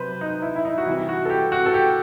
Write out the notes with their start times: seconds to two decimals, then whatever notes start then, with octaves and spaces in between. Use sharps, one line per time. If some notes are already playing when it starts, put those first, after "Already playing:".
Already playing: C3 F#3 B4 C5
0.21 D#4
0.42 E4
0.56 E4
0.65 D#4
0.78 F#4
0.86 C3 E3 G3 E4
1.09 F#4
1.25 A4
1.30 G4
1.52 F#4
1.66 A4
1.74 G4